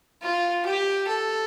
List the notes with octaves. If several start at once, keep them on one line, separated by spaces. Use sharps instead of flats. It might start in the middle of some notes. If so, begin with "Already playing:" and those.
F4
G4
A4